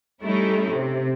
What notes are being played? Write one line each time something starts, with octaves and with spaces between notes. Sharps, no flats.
G3 A3 C#4 D#4 E4
C3